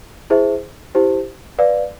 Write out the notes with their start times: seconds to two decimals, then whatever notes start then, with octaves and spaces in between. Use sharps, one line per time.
0.30 E4 G#4 C5 E5
0.95 E4 G4 C5
1.59 B4 D5 F5